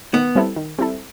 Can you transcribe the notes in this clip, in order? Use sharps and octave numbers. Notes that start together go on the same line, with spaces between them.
D#3 B3
G3 C4 E4 A4
D#3
G3 C4 E4 A4